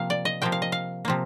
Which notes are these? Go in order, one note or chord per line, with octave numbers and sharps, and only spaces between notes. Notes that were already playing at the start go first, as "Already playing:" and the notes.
Already playing: C3 F3 A#3 F5
D5
D#5
C3 F3 A#3 G5
F5
D#5
F5
C3 F3 A#3